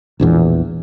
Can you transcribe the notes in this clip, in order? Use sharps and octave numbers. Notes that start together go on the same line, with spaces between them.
E1 A#1 E2